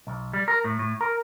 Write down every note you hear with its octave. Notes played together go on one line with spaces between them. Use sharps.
B1
G3
A#4
A2
A2
A#4